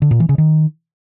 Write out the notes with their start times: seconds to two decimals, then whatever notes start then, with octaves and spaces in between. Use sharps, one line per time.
0.02 D3
0.11 A#2
0.20 E3
0.29 C#3
0.38 D#3